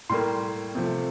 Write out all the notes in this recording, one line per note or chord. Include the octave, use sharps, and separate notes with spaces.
A2 G3 A#3 C6
C3 F3 A3